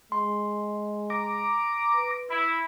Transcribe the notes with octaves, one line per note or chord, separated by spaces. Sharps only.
G#3 C6
A#5 D6
B4
E4